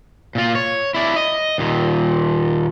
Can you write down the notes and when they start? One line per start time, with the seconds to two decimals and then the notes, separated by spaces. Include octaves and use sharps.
0.35 A#2 F4
0.55 C#5
0.94 E4 D5
1.16 D#5
1.58 D#2 A#2